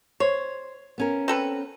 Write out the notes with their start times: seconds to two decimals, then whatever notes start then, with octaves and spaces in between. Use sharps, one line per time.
0.20 C5 C#5
0.98 B3 C#4 A#4
1.28 C4 A4 B4